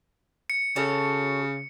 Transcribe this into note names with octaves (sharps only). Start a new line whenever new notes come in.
C#7
C#3 F#4 A4 C#5